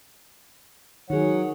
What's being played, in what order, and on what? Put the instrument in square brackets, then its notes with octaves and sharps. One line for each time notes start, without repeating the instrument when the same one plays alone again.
[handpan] D#3 G#4 [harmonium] F#3 C#5 F#5